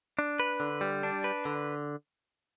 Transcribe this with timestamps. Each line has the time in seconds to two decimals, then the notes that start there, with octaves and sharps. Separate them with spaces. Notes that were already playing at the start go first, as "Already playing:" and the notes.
0.19 D4
0.40 B4
0.60 D3
0.81 G3
1.03 D4
1.24 B4
1.45 D3